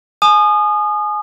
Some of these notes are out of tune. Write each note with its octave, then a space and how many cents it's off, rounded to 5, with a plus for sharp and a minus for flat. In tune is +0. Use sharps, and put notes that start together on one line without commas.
G#5 +25 D#6 -30